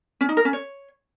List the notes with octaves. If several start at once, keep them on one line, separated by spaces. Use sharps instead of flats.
C#4
D#4
A#4
C#4
C#5